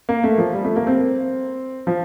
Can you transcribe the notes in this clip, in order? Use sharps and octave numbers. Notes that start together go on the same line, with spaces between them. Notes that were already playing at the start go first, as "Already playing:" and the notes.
A#3
A3
F3
G3
A3
A#3
C4
F3